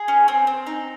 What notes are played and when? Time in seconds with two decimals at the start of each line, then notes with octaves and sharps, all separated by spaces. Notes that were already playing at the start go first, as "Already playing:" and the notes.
Already playing: G#4
0.08 C#4
0.28 C4
0.47 C4
0.67 D#4